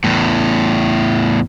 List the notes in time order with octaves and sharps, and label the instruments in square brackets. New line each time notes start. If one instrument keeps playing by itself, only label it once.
[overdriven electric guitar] E2 A2